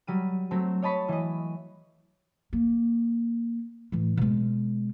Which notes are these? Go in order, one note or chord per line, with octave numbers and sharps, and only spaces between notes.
F#3 G3 D#7
F#3 A3 C4
C#5 D#5 A5 B5 C#6
E3 D#5
A#3
A2 E3
B2 G#3